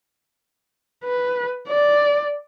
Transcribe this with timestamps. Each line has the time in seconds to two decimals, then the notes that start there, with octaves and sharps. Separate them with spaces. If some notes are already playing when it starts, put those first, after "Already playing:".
1.04 B4
1.68 D5